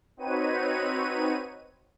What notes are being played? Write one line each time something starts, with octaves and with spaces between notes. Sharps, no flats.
C4 D#4 F#4 B4 C#5 D#7